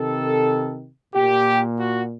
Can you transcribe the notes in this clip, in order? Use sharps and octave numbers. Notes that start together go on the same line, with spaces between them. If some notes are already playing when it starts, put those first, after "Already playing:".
Already playing: C3 D#3 A4
A#2 G4
F#4